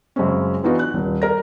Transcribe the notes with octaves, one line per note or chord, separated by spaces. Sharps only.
F#2 C#3 G#3 C4 C#4
E3 B3 D4 D#4 F4 F#4
F#6
D#1
A#4 A#6